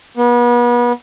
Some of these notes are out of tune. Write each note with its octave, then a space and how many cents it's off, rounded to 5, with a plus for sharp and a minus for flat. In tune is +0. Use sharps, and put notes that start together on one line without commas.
B3 -35